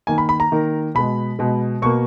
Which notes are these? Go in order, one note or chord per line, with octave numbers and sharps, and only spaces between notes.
D#3 A#3 G#5
B5
B5
A#5
D#3 A#3
B2 G#3 B5
B2 G#3
B2 A#3 C#6